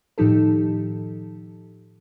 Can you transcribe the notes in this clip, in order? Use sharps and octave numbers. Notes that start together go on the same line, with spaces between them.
A2 D#3 F3 D#4 G4 A4